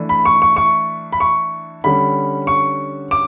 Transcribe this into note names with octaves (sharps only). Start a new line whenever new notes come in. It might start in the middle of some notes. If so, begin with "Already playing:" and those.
Already playing: E3 A3 D4
B5
C#6
C#6
C#6
B5
C#6
D3 G3 C#4 B5
C#6
D6